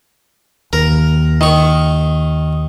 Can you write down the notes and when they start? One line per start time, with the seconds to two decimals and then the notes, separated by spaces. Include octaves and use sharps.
0.73 D#2 A#4
1.41 D#3 C#6